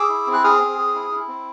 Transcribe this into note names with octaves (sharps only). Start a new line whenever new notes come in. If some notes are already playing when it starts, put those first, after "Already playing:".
Already playing: G#4 D6 E6
E4
C4
F#6
G#4 D#6 F6
C4
G#4
E4
E4
C4